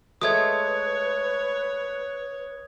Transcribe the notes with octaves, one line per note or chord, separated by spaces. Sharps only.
G#3 A3 B4 C#5 D#6 G#6